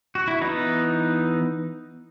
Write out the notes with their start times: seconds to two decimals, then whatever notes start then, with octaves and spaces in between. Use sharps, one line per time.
0.15 F#4
0.28 E4
0.41 E3 B3 D#4